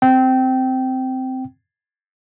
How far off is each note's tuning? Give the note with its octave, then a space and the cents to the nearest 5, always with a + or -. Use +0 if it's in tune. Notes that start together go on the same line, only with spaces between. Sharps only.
C4 -10 G5 -15